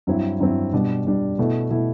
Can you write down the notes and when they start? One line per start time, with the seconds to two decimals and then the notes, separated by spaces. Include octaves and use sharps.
0.07 G2 F#3 C4 E4
0.40 G2 F#3 C4 E4
0.73 B2 G3 D4
1.05 B2 G3 D4
1.38 B2 A3 E4
1.70 B2 A3 E4